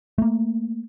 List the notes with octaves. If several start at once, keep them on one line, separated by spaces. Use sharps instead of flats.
A3 A#3